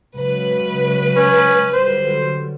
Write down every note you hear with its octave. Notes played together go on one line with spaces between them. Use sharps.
C#3 F#3 G#3 B4
C#4
D3 F#3 G3 C5